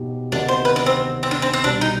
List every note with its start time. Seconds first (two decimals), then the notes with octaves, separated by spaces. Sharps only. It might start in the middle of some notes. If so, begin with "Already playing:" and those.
Already playing: B2 B3 D#4 G4
0.32 D2 C3 D#3 B3 D4 D#4
0.48 C5
0.65 B4
0.76 D4
0.86 C4
1.23 C4
1.31 D4
1.42 C4
1.54 C4
1.64 C2 B2 G3 D4
1.81 D#4